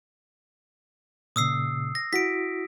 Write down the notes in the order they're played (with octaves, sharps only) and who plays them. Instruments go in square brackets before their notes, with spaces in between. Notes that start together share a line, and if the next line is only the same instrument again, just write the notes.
[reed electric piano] A#2 C#3 [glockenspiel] D#6 E6 C7
[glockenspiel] A#6
[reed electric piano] E4 F#4 [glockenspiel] B6 D7